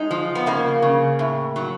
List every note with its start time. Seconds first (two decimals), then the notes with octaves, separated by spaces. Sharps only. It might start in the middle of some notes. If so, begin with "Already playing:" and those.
Already playing: G#3 D#4
0.11 F3
0.35 B3
0.46 C#3 A#3
0.82 C#3
1.19 A2
1.56 F#3